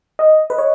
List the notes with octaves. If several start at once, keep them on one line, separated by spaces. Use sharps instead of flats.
D#5
B4
C#5